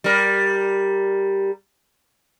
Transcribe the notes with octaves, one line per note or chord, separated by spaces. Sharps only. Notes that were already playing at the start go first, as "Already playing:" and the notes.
G3 A#4